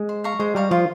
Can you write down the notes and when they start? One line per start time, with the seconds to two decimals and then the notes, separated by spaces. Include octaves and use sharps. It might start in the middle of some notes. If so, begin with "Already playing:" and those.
Already playing: G#3
0.09 C5
0.24 F5 A#5 C#6
0.40 G#3 C5
0.55 G3 F5 A#5 C#6
0.71 F3 F4